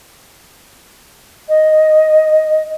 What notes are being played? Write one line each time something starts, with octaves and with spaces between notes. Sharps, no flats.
D#5